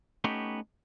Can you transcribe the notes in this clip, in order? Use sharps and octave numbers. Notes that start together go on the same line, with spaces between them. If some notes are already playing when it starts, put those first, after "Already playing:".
A3 B3 C#4 D#4 G4